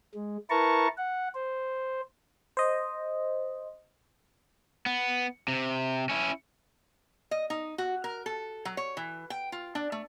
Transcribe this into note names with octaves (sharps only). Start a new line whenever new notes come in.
G#3
E4 A#4 B4 A5 A#5 C#6
F#5
C5
C5 D#5
B3
C3
C#4 E4
D#5
D#4
F#4
A#4
A4
F#3
C#5
E3
G5
F4
D4
A3